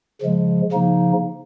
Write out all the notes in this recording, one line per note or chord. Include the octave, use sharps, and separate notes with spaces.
C#3 F3 G#3
C#3 F3 A#3 D#4